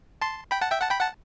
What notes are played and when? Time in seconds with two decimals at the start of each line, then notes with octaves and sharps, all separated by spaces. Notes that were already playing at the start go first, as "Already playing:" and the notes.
0.22 A5 C6
0.51 G5 B5
0.62 F#5 A5
0.71 E5 G5
0.81 F#5 A5
0.91 G5 B5
1.00 F#5 A5